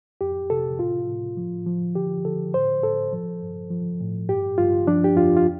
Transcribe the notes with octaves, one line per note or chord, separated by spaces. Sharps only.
F2 G4
C3 A4
A2 F4
A2
F3
F3
D3 G4
D3 A4
A2 C5
A2 A4
F3
G2
F3
A2
G2 G4
G2 F4
F3 D4
G4
F2 F4
F4